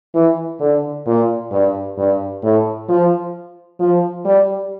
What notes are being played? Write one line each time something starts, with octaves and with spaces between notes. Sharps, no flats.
E3
D3
A#2
G2
G2
A2
F3
F3
G3